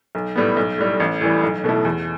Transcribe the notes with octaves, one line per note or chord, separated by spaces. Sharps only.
B1
A2 G3 B3
B1
A2 G3
A1
A2 E3 G3
B1
B2 A3 E4
E2